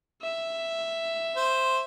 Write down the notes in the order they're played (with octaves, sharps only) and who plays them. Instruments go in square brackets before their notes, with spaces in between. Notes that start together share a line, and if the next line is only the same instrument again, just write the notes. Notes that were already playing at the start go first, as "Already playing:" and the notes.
[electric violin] E5
[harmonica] C5